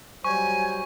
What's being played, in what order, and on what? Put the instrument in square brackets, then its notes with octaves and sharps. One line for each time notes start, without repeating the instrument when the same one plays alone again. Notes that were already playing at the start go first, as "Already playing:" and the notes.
[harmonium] F#3 G3 C5 [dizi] G#5 [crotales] C#6